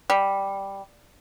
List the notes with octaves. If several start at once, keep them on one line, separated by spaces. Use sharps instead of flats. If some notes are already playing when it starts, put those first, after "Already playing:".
G3